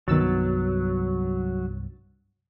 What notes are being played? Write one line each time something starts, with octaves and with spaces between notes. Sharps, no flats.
C2 G2 D#3 F#3 B3 E6 A6